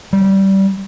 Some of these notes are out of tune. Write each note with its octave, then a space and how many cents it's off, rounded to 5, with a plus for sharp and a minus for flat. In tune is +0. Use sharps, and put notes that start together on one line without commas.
G3 -20